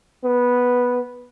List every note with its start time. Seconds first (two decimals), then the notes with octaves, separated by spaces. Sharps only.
0.24 B3